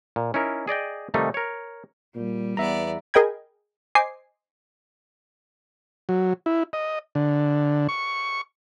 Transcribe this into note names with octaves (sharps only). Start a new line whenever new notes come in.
A#2
C#4 D#4 E4 A#4
G#4 D5 D#5 G5
C3 D#3 F3 G3 A3 D#4
A#4 C#5
A#2 G3
E2 B3 D5 E5 A#5
G#4 A#4 D#5 G5 B5 G#6
C5 D#5 G#5 D6 C7
F#3
E4
D#5
D3
C#6